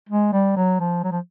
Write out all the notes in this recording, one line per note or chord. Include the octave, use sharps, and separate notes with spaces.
G#3
G3
F#3
F3
F#3
F3